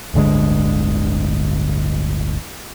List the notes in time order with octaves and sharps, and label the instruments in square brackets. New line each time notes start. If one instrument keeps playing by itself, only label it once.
[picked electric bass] D1 G1 D3 G#3